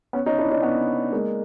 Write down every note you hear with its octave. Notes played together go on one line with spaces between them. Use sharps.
B3 C#4
C#4 D#4
D4 E4
C#4 D#4
B3 C#4
G#3 A#3